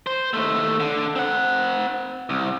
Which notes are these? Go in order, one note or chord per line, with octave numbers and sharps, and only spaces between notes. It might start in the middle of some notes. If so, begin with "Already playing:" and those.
C5
D#2 A3
D3
C4 F#5
C2